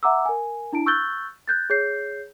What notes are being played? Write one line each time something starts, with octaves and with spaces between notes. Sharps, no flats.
E5 F#5 A#5 D6 E6
A#4 G#5
D4 E4 A5 D7
C#6 E6 F#6 G6 A6 G7
F#6 G6 A6
G#4 C#5 G6 C7